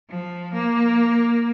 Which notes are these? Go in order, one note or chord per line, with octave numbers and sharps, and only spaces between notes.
F3
A#3